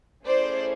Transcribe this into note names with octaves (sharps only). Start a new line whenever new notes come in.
A3 C#4 E4 G#4 C5 D5